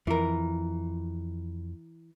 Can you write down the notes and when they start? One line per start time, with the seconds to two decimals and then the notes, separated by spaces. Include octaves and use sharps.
0.07 F2 E3 A#4